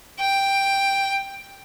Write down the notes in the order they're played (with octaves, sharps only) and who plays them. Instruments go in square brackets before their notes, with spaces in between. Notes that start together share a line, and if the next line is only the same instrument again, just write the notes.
[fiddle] G5